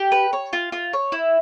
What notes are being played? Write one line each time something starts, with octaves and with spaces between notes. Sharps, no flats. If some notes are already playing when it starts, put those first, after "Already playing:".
Already playing: G4
B4
C#5
F4
F4
C#5
E4